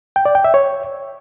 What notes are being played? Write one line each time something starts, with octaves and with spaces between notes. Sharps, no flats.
G5
D5
G5
E5
C#5